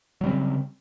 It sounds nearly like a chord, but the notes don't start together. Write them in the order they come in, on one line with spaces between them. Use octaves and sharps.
F#3 G3 C4 C#3